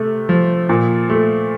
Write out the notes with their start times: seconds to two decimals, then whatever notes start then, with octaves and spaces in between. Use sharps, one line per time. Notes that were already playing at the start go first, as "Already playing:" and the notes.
Already playing: C3 A3
0.29 F3
0.69 A#2
1.10 A3